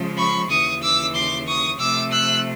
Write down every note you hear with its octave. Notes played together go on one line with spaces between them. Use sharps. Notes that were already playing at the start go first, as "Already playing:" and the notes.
Already playing: C#3 F3 G#3
B5 C#6
D#2 C#3 E3 C#6 D#6
D6 E6
C6 D6
C#6 D#6
C3 F3 A3 D6 E6
E6 F#6